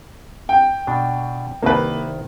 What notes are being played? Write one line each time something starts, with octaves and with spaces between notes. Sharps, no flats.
G5
B2 D4
C2 D#3 A#3 B4 D5